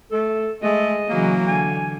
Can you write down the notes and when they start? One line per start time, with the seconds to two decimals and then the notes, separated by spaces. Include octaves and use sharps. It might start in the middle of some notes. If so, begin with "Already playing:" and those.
0.11 A3 A4
0.63 G#3 A3 D#5
1.09 C#3 E3 F#3 A#3
1.47 D3 G#5